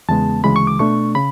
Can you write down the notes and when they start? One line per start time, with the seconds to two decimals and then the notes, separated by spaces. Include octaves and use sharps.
0.09 E2 C#3 G#3 B3 A5
0.44 D2 C#3 E3 G#3 B5
0.56 C#6
0.67 D6
0.79 B2 A3 D4 C#6
1.15 C#3 B5